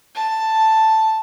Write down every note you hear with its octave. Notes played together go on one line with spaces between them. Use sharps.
A5